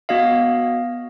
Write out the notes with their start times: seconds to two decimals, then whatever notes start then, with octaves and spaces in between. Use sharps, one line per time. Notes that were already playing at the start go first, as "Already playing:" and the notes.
0.09 B3 F#4 D#5 F5